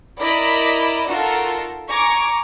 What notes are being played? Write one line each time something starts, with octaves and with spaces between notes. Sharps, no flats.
E4 A#4 D5 D#5 B5 B6
D#4 F4 F#4 A4 A#4
G#5 A#5 C#6 D6